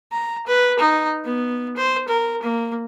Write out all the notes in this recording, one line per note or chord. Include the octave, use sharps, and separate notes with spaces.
A#5
B4
D#4
B3
C5
A#4
A#3